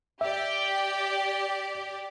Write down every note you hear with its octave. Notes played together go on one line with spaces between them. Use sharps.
G4 D5 E5 G5